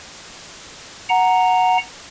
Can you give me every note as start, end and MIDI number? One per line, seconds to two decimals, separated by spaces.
1.09 1.78 78
1.09 1.78 82